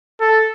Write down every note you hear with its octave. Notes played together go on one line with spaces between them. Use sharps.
A4